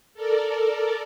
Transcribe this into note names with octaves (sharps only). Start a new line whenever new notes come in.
A4 A#4 D5